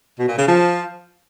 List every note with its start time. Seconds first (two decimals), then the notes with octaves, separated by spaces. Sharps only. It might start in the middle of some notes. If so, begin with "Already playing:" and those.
0.19 B2
0.28 A#2
0.38 C#3
0.48 F3